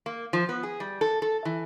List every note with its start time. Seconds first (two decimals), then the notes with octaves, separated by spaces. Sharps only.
0.06 A#3
0.33 F3
0.49 B3
0.63 G#4
0.80 G3
1.01 A4
1.22 A4
1.45 E3